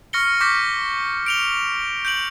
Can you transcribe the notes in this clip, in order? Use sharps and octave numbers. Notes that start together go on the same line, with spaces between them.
C#6 F6 A#6 C#7 G7
C#6 D6 G6 A#6 B6
D7 F7 G7
G6 D7 F#7